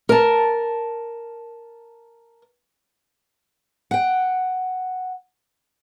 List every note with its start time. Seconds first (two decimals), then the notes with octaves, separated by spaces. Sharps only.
0.09 A#4 A5
3.91 F#5 G5